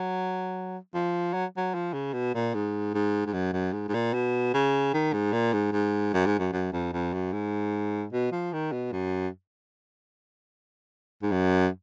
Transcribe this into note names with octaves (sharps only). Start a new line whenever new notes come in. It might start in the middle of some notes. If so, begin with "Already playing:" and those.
Already playing: F#3
F3
F#3
F#3
F3
C#3
B2
A#2
G#2
G#2
G#2
F#2
F#2
G#2
G#2
A#2
B2
C#3
D#3
G#2
A#2
G#2
G#2
F#2
G#2
F#2
F#2
F2
F2
F#2
G#2
B2
F3
D#3
B2
F#2
G#2
F#2